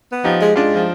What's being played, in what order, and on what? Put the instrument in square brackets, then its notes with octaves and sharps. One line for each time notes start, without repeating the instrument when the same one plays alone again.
[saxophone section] B3
[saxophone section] F3 [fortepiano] D#4 G4
[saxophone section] G#3
[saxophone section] G#3 [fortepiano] D4 F4
[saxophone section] F3